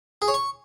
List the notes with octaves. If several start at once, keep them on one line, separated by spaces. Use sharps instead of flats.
G#4
C#5
C#6